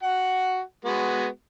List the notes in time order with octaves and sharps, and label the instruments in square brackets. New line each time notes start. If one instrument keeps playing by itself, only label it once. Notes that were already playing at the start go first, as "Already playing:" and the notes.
[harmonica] F#4 F#5
G#3 B3 F#4